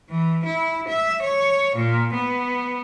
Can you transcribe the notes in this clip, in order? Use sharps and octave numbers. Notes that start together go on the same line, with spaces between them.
E3
E4
E5
C#5
A#2
B3